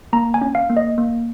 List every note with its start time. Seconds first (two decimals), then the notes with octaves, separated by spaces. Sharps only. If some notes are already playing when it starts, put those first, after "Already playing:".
0.13 A#3 A#5
0.34 G#5
0.41 C#4
0.55 F5
0.70 A#3
0.77 D#5
0.98 A#3